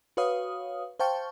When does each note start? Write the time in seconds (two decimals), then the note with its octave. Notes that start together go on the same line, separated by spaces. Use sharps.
0.17 F#4 B4 C#5 F5 D#6
1.00 C5 F5 G5 A5 C#6